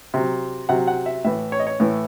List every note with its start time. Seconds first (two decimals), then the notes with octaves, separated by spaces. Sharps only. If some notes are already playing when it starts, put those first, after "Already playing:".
0.14 C3 F#3
0.69 C3 F#3 F#5
0.87 F#5
1.06 E5
1.24 A2 E3 E5
1.52 C#5
1.59 D#5
1.67 C#5
1.80 A2 E3